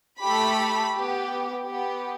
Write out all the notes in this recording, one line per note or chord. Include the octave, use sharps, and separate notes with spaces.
A3 G4 B5
B3 G4
B3 G4